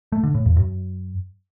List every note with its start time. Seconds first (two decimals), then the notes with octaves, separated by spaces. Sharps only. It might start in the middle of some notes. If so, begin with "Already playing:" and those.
0.12 A3
0.23 D3
0.35 A2
0.46 E2
0.57 F#2